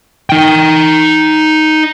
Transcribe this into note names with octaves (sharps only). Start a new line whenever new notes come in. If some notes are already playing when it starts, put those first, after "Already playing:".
D#4 G5